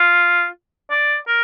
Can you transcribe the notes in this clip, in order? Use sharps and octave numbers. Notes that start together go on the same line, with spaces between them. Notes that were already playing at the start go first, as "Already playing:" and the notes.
Already playing: F4
D5
A#4